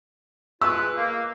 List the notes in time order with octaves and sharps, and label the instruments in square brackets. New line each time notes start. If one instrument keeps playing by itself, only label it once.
[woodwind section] G#3 F4 B4 [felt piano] E6
[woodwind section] A#3